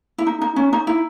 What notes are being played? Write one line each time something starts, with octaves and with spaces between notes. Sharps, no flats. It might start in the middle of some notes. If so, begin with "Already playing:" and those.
E4
D#4
D#4
C#4
D#4
E4